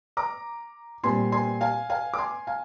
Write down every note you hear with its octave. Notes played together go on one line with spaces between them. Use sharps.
A#5 D6
A#2 G3 C4 G#5 C6
G#5 C6
F5 G#5
F5 G#5
D6
G#5 C6
F5 G#5